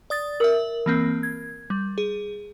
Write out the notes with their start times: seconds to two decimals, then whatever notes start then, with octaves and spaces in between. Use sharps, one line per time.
0.10 D5 D#6 A6
0.40 A#4 E5 D#6 F#7
0.86 E3 A#3 C4
1.23 G#6
1.70 G3
1.98 G#4